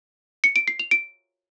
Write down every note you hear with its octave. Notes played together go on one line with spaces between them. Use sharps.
C#7
D7
C7
F7
D7